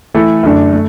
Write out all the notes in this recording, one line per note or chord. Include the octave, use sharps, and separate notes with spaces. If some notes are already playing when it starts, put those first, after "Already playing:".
E3 A3 E4 A4
F#2 D3 A3 D4
A3